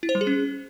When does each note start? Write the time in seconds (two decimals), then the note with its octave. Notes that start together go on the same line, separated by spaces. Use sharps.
0.03 E4
0.09 C5
0.15 G3
0.21 G#4
0.27 C#4